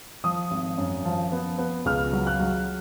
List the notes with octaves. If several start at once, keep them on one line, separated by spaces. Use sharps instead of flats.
F3 D#6
G#1
F#2
F3
B3
B3
C#2 F6
F#3
F#6
F#3